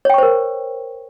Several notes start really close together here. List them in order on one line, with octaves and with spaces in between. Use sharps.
C#5 G5 C#6 C5 A#4